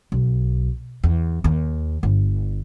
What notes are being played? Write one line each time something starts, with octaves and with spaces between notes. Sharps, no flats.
B1
E2
D#2
G1